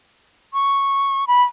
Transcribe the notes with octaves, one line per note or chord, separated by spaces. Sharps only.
C#6
B5